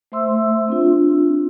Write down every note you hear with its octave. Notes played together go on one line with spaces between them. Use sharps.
A3 C5 E5 C6 E6
C4 D4 F4